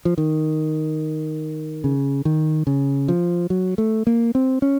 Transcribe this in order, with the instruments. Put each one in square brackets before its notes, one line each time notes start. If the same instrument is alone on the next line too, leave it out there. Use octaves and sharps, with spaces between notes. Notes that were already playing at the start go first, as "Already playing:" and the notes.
[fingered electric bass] F3
D#3
C#3
D#3
C#3
F3
F#3
A3
A#3
C4
C#4